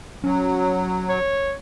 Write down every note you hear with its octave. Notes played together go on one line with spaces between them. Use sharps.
F#3 C#4
C#5